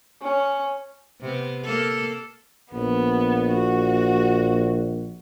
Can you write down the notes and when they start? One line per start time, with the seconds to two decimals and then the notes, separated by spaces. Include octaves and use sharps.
0.22 C#4
1.21 C3 B3
1.65 A#3 A4
2.73 A#1 B3
3.53 F#4